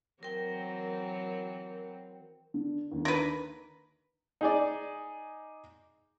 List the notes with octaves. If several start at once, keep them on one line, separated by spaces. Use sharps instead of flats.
E3 F#3 C4 A#4 G5
D3
D#2 D3
A#4 B4
D#4 G#4 D5